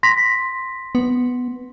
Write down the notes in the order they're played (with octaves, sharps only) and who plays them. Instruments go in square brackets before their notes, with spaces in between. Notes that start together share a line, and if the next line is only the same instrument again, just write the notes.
[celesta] C6 A#6 B6
[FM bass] B3